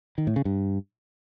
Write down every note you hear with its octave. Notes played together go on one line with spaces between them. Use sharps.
D#3
A2
C#3
G2